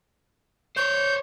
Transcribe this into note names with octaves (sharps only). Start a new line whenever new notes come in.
C5 C#5 G6